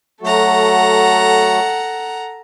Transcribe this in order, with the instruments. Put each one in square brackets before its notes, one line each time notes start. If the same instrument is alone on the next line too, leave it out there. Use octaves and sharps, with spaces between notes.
[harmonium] F#3 A3 F#4 [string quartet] A4 F#5 A#5